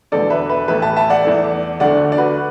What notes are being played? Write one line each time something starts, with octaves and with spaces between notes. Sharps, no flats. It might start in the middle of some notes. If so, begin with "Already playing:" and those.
E1 E2 D3 A4 D5
B4 E5
B4 E5
A1 A2 E3 A3 B4 E5
E5 A5
E5 A5
D5 F#5
E2 E3 A3
D2 D3 A3 D5 F#5
D5
F#4 B4